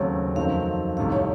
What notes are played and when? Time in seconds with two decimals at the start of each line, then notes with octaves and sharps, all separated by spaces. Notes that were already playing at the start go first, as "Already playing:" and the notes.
Already playing: D#2 C#3 F#3 A3 C4 C#5
0.36 F2 D#3 F#3 A3 C4 F5
0.97 C2 C3 D#3 A3 F5
1.12 C#5